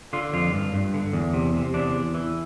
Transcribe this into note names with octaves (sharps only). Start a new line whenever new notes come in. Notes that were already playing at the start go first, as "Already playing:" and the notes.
D3 F4
F2 F4
G2
G2
D3
E2
C3
C3
E2 D4
E2
E3